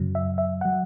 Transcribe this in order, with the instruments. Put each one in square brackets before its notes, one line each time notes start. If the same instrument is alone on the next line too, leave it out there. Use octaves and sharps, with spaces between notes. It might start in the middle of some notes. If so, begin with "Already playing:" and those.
Already playing: [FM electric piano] F#2 C#3 F#3
E5
E5
F#3 F#5